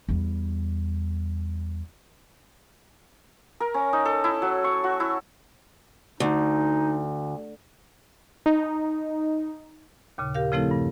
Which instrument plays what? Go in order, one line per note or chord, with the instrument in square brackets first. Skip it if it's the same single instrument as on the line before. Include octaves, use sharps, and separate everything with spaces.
[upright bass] E2 G3
[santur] A#4
C#4
D#4
A4
E4
F#3
C#6
F#4
E4
[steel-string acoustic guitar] D2 [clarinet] D#4
[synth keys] D#4
[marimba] D#2 A#2 C#3
G4 A#4 F5
C#3 F3 A3 C4 E4 A4
G2